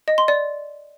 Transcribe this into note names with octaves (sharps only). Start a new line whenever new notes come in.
D#5
C6
D5